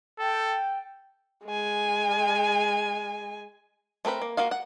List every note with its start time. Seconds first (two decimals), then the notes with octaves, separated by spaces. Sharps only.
0.19 A4 G5
1.46 G#3 G#5
4.05 A3 C4 A#4 B4
4.22 A#3
4.37 A#3 F4 F#4 F5
4.51 F#5